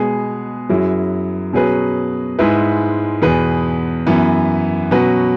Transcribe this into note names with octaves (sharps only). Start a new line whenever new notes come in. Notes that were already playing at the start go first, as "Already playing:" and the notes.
Already playing: B2 G#3 B3 G#4
F#2 F#3 E4 G#4
B2 F#3 C#4 G#4 B4
G#2 G#3 E4 B4
E2 B2 B3 G#4 B4
F#2 E3 B3
B2 F#3 C#4 F#4 B4